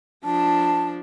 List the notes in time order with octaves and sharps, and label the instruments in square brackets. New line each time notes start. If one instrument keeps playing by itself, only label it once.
[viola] F3 D4 [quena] A5